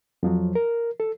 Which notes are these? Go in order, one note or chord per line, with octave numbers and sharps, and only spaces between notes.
F2 F3 F#3
A#4
A4